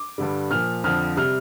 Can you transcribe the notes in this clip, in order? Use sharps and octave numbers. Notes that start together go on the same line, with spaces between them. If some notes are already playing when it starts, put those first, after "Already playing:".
Already playing: D6
G2 D3 G3
A#2 F3 F6
F2 D3 F3 F6
C3 G3 F6